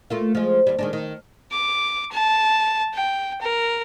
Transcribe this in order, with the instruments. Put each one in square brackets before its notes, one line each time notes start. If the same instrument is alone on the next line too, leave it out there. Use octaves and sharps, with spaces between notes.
[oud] A3 A#3 F4
F3 G#3
D#2 G3
D#3 G#3 D4
D#3
[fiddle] D6
A5
G5
A#4